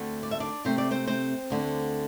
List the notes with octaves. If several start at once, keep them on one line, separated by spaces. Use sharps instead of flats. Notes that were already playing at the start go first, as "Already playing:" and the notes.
Already playing: D2 D3 A3 C4
D5
E5
D4 D5
C3 A3 C4 C5
D5
C4 C5
C4 C5
D2 D3 C4